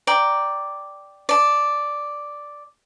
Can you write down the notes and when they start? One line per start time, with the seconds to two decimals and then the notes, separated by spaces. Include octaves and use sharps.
0.07 D5 G5 A#5
1.29 D5 A5